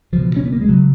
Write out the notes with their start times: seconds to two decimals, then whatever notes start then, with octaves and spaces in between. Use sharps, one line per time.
0.12 C#2 B2 F3
0.36 C#4
0.45 B3
0.53 A#3
0.61 G#3
0.69 C#3 F#3